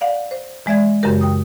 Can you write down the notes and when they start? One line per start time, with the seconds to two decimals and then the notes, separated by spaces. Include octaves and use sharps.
0.01 D5 F5 F#5
0.31 C5
0.66 E3 G#3 D5 E5 G#6
1.03 F#2 C#3 E3 G#3 G4 A#4
1.21 G5 D#6